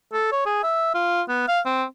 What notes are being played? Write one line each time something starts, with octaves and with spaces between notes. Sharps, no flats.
A4
C#5
G#4
E5
F4
B3
F5
C4